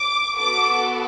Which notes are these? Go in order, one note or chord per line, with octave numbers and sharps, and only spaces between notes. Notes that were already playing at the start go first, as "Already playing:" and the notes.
Already playing: D6
B3 F#4 A4 D6